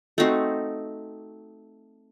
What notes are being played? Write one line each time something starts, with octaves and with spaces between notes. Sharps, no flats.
A3 C4 D#4 F#4